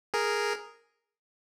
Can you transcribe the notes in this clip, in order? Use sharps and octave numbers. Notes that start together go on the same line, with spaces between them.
G#4 A#4